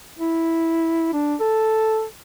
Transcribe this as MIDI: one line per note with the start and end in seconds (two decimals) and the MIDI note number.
0.19 1.10 64
1.13 1.35 62
1.40 2.04 69